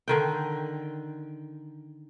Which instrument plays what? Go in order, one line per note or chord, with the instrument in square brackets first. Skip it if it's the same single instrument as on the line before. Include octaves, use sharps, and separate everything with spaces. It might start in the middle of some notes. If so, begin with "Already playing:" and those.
[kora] D3 D#3 G5